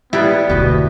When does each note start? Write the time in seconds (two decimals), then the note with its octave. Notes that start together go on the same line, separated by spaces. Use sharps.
0.13 G3 B3 E4 G#4 B4
0.49 F1 D2 B2 G4 D#5